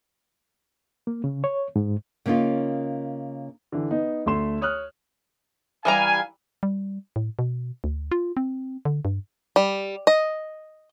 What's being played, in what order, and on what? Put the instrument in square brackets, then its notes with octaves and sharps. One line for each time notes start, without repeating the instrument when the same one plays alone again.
[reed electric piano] A#3
C#3
C#5
G#2
[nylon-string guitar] C#3 A#3 C#4 D#4 F4
[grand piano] D3 E3
B3 D#4
D2 A3 C6 E7
C#5 D#6 F6 F#6
[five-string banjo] E3 G3 A#5 [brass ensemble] F5 G#5
[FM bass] G3
A2
B2
D2
F4
C4
D3
G2
[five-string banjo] G3
D#5